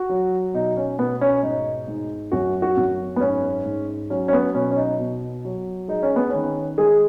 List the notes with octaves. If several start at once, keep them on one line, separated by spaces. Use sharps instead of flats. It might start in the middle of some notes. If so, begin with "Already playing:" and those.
Already playing: F#4
F#3
B2 D#4
C#4
B2 B3
C#4
G#2 D#4
G#2
F#2 F#4
F#4
F#2
B3
G#2 C#4
G#2
F#3 C#4
C#4
B3
B2 C#4
C#4
D#4
B2
F#3
G#3 D#4
C#4
B3
D#3 C#4
G#3 G#4